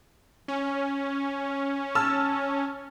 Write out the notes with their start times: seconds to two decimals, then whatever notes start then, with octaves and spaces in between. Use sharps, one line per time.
0.48 C#4
1.95 A5 E6 F6